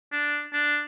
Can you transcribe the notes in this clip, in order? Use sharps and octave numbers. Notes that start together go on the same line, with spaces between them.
D4
D4